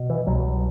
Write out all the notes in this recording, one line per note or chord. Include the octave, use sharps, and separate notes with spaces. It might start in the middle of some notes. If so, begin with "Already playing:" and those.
Already playing: B2
E3
C2 B2 F#3